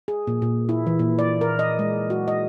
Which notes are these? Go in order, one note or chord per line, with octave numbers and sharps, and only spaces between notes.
G#4
A#2
A#2
E4
E3
A#2
D5
A#4
D#5
G#3
F#4
D#5